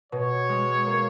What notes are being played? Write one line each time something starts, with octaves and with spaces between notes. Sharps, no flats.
B2 C#5
G#3
A#3